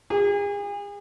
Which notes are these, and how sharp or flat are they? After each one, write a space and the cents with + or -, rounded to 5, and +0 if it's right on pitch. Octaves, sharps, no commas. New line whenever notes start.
G#4 -40